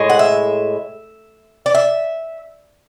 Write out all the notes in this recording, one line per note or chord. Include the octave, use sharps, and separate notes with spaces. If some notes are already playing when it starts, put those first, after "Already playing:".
Already playing: A2 G#3
F#5
E5
D5
E5